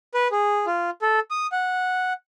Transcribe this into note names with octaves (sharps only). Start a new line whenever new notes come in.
B4
G#4
F4
A4
D#6
F#5